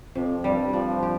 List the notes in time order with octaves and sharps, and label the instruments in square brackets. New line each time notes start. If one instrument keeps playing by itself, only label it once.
[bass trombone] F2 [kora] C3
[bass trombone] G2 [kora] G3
[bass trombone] F3 [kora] D4
[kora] G4